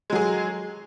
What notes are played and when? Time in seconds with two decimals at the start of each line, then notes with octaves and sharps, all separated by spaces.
0.10 G#3
0.13 F#3
0.15 G#4